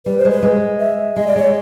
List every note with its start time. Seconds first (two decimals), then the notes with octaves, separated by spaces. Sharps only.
0.06 G3 B4
0.18 C5
0.25 G#3
0.31 B4
0.43 G#3
0.80 E5
1.16 G#3 D#5
1.27 D5
1.36 G#3 C#5